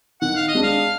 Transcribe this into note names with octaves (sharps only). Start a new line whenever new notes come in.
D#3 F#5
F5
D#5
G#3 D4
F5